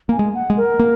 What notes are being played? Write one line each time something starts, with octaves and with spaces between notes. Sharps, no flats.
A#3 G#5
G#3
F#5
G#3
A#4
A#3